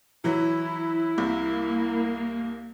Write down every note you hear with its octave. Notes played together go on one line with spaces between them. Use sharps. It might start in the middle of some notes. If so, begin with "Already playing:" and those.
E3 F#3 E4
C2 A#3